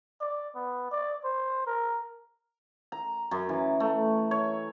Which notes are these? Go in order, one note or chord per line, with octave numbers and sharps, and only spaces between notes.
D5
B3
D5
C5
A#4
A#5
F#2
E3
A3
C#5